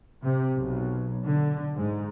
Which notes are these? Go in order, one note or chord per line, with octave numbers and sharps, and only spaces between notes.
C3
B1
D3
G#2